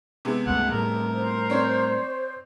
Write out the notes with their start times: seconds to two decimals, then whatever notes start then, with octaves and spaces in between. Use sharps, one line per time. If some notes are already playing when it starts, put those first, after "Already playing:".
0.25 C3 G#3 B3
0.46 C#2 G2 A3 F#5
0.71 A2 G3 A3 A#4
1.15 C5
1.50 C4 C#5 D5